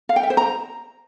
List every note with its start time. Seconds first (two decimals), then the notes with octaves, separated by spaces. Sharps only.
0.09 F5
0.16 G5
0.23 E5
0.30 C5
0.37 A#5